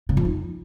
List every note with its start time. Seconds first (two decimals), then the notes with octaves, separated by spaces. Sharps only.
0.09 C#3
0.17 F2
0.25 D#3